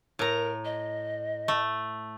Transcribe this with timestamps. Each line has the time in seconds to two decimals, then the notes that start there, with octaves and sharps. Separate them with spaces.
0.19 A2 A#4 A#5
0.65 D#5
1.48 A3